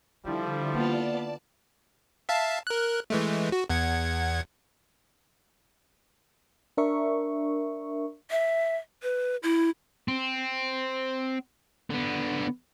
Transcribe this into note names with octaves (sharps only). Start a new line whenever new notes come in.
D3 F3 G3 D#4 E4
A#3 B3 F4 D5 A5
E5 F5 A5
A#4 F#6
E3 G#3 A3
F#4
E2 F#5 G#6
D4 A#4 E5 C#6
E5
B4
E4
C4
D3 B3